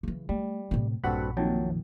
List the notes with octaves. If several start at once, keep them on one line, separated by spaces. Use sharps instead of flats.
C#3 E3
G3 A3
A2 C3
A#1 G2 C4 F#4 A4 F#5 B5
F2 A#2 D#3 F#3 G5 A5